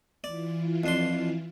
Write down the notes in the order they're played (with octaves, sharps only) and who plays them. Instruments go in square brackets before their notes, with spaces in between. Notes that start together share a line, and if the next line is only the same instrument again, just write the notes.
[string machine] E3 E4 F4 [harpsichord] D5
[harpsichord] F2 D4 C6